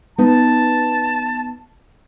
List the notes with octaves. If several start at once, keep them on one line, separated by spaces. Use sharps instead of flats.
B3 D#4 A5